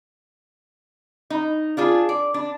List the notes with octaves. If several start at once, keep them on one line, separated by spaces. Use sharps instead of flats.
D#4
D4 F4 G#4
D5
D4